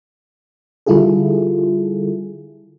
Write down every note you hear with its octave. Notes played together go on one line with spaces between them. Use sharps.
D3 G3 E4 F4 G#4 A4